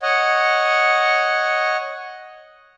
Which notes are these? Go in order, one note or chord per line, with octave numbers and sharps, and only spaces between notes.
C#5 D#5 F#5